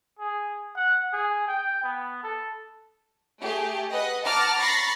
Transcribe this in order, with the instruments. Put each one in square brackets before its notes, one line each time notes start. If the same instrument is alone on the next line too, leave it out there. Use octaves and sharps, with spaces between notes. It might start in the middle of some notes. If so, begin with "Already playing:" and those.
[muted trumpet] G#4
F#5
G#4
G5
B3
A4
[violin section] A3 G4 G#4
B4 D#5 F#5
F#5 A5 A#5 D6 F6
A#5 B5 C#6 A6 A#6 C7